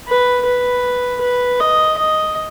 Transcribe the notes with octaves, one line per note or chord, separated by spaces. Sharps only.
B4
B4
B4
D#5
D#5